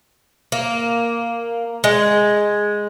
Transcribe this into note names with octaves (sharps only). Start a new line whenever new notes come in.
A#3
G#3